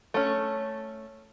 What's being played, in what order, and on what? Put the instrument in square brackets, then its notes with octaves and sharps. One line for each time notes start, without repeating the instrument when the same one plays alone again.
[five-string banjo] A3 C#4